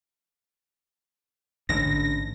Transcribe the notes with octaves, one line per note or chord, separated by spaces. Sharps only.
A1 G#2 D3 A#6